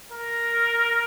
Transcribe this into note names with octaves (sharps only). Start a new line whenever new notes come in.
A#4